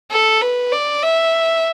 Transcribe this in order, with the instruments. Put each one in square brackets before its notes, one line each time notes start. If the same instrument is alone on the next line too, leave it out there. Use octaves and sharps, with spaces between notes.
[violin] A4
B4
D5
E5